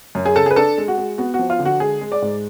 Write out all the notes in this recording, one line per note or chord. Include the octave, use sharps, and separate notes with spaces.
F#2
G#4
C#3 A4
G#4
B4
D4 A4
G#3
F#4
G#3
B3 F#4
F#4
F3
F4
D3
F#4
G#3 G#4
G#3
D5
G#2